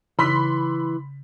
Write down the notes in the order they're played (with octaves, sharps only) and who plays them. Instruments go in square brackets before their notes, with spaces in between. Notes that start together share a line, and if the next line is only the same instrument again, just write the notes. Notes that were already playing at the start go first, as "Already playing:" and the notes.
[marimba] C#3 [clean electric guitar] E3 [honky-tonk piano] B5 C6 B6